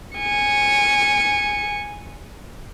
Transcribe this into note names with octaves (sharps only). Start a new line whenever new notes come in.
G#5 C#7